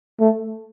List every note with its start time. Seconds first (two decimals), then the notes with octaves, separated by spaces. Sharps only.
0.20 A3